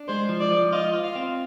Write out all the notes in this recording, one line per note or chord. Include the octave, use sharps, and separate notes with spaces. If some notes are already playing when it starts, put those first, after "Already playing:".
Already playing: D4
G#3 C5
F3
D5
F3
F4 D#5
F4
F5
C4